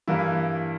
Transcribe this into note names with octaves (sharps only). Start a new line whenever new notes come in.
G2 E3 A#3 E4